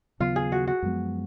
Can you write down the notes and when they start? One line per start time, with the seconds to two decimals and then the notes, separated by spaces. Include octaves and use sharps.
0.20 D#2 C#3 F#3 B3 F4
0.36 G#4
0.52 F#4
0.67 F#4
0.83 F#2 F3 G#3 B3